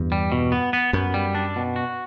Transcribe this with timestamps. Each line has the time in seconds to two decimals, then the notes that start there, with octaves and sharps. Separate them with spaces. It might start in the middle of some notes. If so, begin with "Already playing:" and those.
Already playing: E2 G2
0.12 G3
0.32 B2
0.52 B3
0.73 B3
0.93 F#2 B3
1.14 G3
1.35 D4
1.56 B2
1.76 F#4